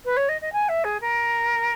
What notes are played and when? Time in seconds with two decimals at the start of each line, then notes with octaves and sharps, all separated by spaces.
0.05 B4
0.17 C#5
0.29 D#5
0.41 D#5
0.53 G#5
0.69 E5
0.84 G#4
1.01 A#4